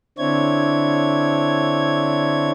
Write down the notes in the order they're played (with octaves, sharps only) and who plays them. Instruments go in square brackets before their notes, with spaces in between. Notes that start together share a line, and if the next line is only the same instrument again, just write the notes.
[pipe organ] D3 C4 D4 E4 C#5 G#6